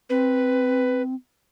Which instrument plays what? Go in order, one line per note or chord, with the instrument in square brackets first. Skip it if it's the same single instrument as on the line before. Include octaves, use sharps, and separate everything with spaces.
[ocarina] C4 [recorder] B4